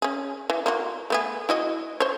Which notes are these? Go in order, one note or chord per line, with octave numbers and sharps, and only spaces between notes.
C#4 G#4
E3
A#3 F4 F#4
A3 B3 G#4
E4 F#4 D#5
C5 C#5